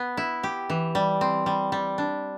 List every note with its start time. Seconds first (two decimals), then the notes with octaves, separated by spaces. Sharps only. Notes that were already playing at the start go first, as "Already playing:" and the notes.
Already playing: B3
0.17 E4
0.43 G4
0.70 E3
0.95 G3
1.21 C4
1.46 G3
1.72 G3
1.98 D4